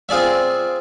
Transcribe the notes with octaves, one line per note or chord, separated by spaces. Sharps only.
C4 F4 G#4 D5 E5